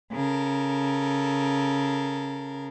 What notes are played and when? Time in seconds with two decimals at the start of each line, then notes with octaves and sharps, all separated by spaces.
0.11 C#3 A4 A#4